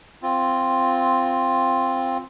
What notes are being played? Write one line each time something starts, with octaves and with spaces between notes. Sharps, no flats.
C4 F4